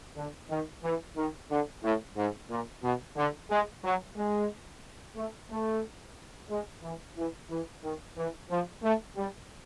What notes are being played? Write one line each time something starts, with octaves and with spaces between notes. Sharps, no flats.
D3
D#3
E3
D#3
D3
A2
G#2
A#2
B2
D3
G#3
F#3
G#3
A3
A3
G#3
E3
E3
E3
D#3
E3
F3
A3
G3